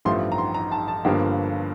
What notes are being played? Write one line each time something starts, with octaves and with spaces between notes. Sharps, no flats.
A1 G2 F3 A3 C6
A#5
C6
A#5
A5
A5
G1 G2 D3 F3 A#3